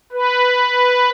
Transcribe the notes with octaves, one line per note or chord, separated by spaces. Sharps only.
B4